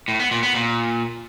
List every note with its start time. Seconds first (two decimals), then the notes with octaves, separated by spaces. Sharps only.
0.08 A2
0.20 B3
0.31 A#2
0.43 B3
0.55 A#2